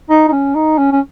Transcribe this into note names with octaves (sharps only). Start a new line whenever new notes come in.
D#4
D#4
C#4
D#4
C#4
C#4